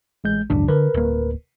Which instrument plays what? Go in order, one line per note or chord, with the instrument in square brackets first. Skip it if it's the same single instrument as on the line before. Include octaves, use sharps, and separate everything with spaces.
[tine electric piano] A1 G#3 G6
[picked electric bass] G#1 C#2 F#2 [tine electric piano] D4
[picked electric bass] D3 [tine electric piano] A#4 B4
[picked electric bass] D1 A#3